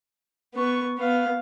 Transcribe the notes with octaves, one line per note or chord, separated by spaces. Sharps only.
B3 C#6
B3 F5